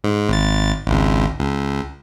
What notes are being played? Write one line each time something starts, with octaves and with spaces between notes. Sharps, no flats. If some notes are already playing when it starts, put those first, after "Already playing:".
G#2
G#1 A6
G#1 C#2
C#2